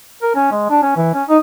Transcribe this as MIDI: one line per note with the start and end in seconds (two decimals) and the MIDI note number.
0.22 0.32 70
0.35 0.49 61
0.52 0.66 56
0.70 0.80 62
0.82 0.95 61
0.97 1.14 52
1.14 1.23 61
1.29 1.38 63